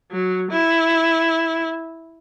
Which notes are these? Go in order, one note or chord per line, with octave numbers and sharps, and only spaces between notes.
F#3
E4